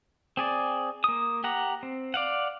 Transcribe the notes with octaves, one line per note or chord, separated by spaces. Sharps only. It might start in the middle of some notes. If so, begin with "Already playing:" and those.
C4 G#4 D5
A#3 D#6
G4 F#5 A#5
C4
D5 F5 F#5